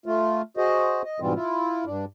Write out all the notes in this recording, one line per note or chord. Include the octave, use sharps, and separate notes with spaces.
A3 F4
F#4 G#4 C5 D#5
D#5
G#2 B2 E3 G3 C4 F4
E4 F4
G2 D4